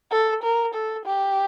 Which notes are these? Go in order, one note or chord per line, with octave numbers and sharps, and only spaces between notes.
A4
A#4
A4
G4